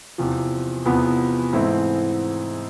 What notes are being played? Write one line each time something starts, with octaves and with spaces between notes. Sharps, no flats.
E2 C3 F3
E2 C3 F3 B3
G#2 E3 A3 C4 E4